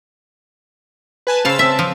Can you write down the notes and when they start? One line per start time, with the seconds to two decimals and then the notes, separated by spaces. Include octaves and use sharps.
1.27 B4 G#5 A5
1.45 C#3 C5 F5 A5 E6
1.59 C4 E5 A5
1.79 F3